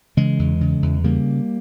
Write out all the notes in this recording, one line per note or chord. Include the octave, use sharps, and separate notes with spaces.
C#3 E3 G#3
E2
C#3
E2
C#3 G3 A#3